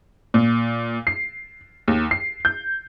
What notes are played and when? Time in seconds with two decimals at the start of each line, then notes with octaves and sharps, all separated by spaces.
0.34 A#2
1.07 C7
1.88 D#2
2.11 C7
2.45 G6